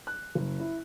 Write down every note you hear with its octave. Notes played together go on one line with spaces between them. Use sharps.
F#6
F#1
E4